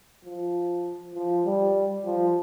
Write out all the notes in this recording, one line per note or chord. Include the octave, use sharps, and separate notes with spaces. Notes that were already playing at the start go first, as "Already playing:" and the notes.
F3
F3
G3
F3